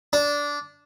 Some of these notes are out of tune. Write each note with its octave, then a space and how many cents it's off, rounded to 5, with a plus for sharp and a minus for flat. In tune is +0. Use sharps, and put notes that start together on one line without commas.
D4 -15